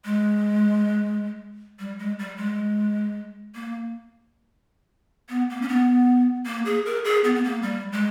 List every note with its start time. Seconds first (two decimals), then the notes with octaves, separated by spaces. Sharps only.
0.05 G#3
1.79 G3
1.99 G#3
2.19 G3
2.37 G#3
3.55 A#3
5.29 B3
5.50 A#3
5.62 C#4
5.68 B3
6.46 A#3
6.65 G#4
6.86 A#4
7.04 G#4
7.24 B3
7.35 B3
7.44 A#3
7.63 G3
7.92 G#3